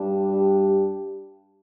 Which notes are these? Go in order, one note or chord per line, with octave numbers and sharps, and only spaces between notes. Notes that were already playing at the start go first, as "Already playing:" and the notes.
Already playing: G2 G3 D4
G4
G4